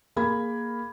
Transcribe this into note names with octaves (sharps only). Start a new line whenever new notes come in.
A#3 G#4 A#4 B5 G#6